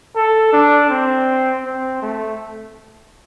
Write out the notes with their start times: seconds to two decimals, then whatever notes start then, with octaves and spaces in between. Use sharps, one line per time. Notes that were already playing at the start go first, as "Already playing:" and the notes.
0.16 A4
0.53 D4
0.90 C4
1.65 C4
2.02 A3